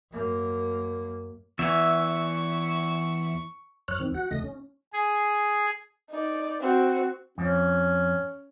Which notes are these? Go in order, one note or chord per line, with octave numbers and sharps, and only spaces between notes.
F#2 A#3
E2 E3 E5 C#6
F#2 C#5 F6 F#6
E2 D#3 C4
F#4 F#5
E2 C#3 A3 D#5 A#6
C#4
G#4
D#4 D5
C4 F#4
F2 C#4